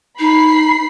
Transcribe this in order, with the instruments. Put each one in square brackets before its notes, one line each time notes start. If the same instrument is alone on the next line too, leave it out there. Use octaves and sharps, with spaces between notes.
[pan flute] D#4 [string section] B5 C7